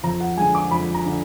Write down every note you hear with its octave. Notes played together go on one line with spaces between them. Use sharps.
F2 A#5
F#5
D3 G#3 G#5
D6
F2 B5
A#5
D3